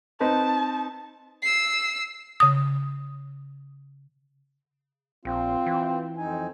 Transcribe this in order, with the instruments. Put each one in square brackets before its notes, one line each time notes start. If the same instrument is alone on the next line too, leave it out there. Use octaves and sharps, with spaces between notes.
[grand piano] C4 D#4 B4 [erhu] A5
[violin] E6 C7
[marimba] C#3 D#6
[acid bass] A#1 [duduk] C4 [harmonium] F4
[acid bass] E3
[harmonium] F2 D#4 G#5 [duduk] C4